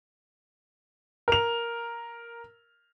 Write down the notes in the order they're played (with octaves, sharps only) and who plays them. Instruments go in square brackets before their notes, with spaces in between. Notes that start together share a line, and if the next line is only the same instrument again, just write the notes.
[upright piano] A#4 F7